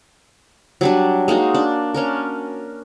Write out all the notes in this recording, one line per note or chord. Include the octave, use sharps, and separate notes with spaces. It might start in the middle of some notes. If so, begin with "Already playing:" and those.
F#3 G3 D4
G#3 A#3 D#4 F#4
D4
C#4 D4 A#4